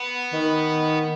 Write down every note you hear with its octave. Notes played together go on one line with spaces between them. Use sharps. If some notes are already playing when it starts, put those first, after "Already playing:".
Already playing: B3
D#3